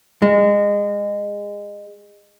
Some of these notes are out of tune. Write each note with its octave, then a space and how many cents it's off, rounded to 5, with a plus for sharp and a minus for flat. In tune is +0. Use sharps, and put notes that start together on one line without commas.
G#3 -25